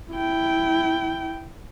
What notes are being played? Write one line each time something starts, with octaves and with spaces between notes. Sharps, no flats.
E4 G5